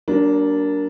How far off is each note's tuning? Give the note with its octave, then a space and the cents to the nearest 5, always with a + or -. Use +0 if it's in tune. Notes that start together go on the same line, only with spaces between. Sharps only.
F#3 +35 A#3 +0 D4 -15